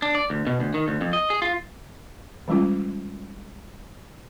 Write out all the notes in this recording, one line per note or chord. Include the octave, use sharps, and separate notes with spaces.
D4
D5
D2
B2
D2
D#3
D2
F2
D#5
G#4
F4
E3 G3 G#3 C#4 F4